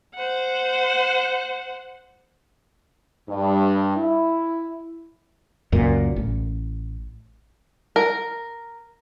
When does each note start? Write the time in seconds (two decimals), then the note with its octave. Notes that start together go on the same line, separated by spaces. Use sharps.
0.15 C5 F#5
3.28 G2
3.97 E4
5.72 C#2 F#2 A#2
6.16 A1
7.96 A#4